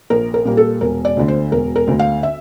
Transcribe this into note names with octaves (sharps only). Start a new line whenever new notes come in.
A#1 A#4
A#4
A#2 G3 A#3
A4
E1 A#4
D5
D2 D3
C5
E1 A#4
A#4
D2 D3
F5
E5